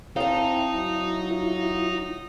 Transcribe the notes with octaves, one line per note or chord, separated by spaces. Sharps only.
C4 D#4 E4 F5 A5
F#3
E4 F4